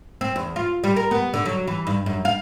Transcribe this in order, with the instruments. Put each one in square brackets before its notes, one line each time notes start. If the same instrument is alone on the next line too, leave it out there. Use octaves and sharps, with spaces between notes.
[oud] C4
E2
F4
G3
A#4
B3
D3
F#3
E3
G2
F#2
F5